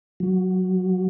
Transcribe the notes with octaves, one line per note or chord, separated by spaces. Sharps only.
F#3